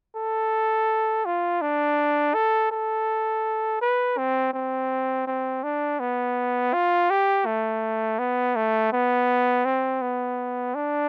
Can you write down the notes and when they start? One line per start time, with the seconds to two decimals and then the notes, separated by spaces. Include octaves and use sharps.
0.16 A4
1.25 F4
1.62 D4
2.34 A4
2.71 A4
3.81 B4
4.18 C4
4.53 C4
5.27 C4
5.63 D4
6.00 B3
6.73 F4
7.10 G4
7.46 A3
8.19 B3
8.56 A3
8.92 B3
9.65 C4
10.02 B3
10.75 D4